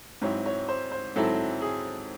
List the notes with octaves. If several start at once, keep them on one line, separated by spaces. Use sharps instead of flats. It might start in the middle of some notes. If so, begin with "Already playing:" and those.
G#2 F#3 C4 E4 C#5
C#5
C5
C5
G#2 F#3 C4 E4 A4
G#4